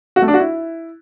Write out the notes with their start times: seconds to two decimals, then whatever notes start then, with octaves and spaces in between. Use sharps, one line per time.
0.16 F#4
0.22 A3
0.28 D4
0.34 F#4
0.40 E4